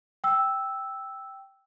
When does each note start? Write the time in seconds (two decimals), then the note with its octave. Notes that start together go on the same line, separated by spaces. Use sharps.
0.24 G5 E6